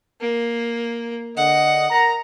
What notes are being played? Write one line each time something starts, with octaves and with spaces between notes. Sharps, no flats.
A#3
D3 D#5 F#5
A#4 A#5